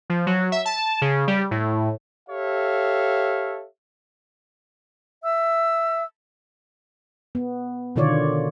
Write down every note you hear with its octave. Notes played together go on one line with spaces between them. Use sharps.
F3
F#3
E5
A5
C#3
G3
A2
G4 A4 C#5 E5 F5
E5 E6
B3
B2 D3 D#3 F4 C#5 D5